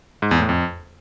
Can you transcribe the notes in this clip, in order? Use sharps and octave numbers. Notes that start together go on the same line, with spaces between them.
G#2
E2
A2
F2